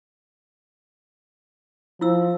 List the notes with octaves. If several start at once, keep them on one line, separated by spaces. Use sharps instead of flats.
F3 E4 E6